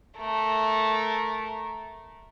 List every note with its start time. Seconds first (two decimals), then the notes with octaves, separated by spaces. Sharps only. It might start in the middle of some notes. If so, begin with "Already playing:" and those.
0.18 A3 A#4